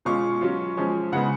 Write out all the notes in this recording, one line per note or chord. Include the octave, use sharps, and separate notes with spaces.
B2 G#3 C#4 F4 C#6
F#3 C#4 F4
F3 G#3 C#4
C#3 G#3 B3 F#5